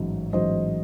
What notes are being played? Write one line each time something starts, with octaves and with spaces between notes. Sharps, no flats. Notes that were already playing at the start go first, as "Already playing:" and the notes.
Already playing: A1 G#2 F#3
A1 G#2 F#3 C5 D#5